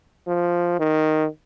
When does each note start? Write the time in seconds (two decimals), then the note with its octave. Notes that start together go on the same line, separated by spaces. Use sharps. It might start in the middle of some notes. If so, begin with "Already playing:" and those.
0.27 F3
0.79 D#3